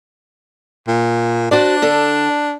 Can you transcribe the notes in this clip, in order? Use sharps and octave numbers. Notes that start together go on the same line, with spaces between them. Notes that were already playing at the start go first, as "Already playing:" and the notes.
A#2
D4 F#4 C5 D5
D3 A4